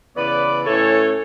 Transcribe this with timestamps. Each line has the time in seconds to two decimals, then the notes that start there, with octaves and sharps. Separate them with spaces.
0.16 C#3 E3 B3 B4 D5
0.65 A2 E3 A3 C#4 A4 C#5